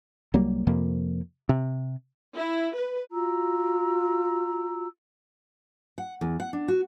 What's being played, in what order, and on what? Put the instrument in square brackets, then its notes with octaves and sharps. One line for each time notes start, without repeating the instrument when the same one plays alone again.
[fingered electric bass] C2 F#3 G3 A#3
F2 C3 F3 A#3
C3
[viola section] E4
B4
[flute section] F4 F#4 A#5 E6
[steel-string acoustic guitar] F#5
E2
F#5
D4
F#4